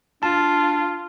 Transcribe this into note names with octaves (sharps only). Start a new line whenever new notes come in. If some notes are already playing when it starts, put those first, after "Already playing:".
D4 F4 A5